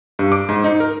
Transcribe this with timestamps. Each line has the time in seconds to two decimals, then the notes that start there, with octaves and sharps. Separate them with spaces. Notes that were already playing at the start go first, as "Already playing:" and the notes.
0.19 G2
0.32 D6
0.49 G#2
0.64 D#4
0.80 A#4